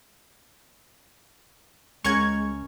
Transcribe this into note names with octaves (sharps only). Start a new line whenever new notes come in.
C#2 G#3 C#4 A#4 F#5 C#6 G#6